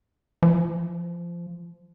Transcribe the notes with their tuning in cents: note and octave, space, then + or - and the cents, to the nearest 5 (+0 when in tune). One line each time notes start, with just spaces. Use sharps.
F3 -20